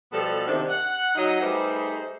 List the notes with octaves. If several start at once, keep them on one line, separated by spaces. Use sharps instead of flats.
B2 F3 G3 B3 A4
C3 D#3 D4
F#5
F#3 D#4 D#5
G3 A3 D#4 G#4 B4 C5